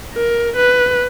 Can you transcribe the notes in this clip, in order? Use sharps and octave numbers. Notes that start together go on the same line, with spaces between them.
A#4
B4